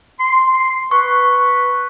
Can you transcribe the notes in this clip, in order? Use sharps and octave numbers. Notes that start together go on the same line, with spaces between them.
C6
B4 C#6